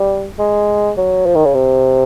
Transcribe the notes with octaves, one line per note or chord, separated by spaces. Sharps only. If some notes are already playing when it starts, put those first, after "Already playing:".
Already playing: G3
G#3
F#3
F3
D#3
C#3
C3